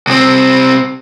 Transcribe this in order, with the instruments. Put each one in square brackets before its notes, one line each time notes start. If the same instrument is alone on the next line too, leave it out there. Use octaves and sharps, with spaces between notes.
[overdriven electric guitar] C2 C4